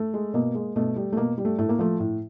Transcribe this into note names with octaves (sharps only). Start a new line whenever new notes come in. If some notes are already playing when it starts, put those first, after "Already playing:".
Already playing: A3
G#3
B2 A#3
G#3
B2 A3
G3
A3
B2 A#3
G3
A3
A2 A3
A#3
F3 A3
A2